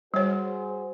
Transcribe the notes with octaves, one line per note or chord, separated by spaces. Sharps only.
G3 F#4 G#4 C5 C#5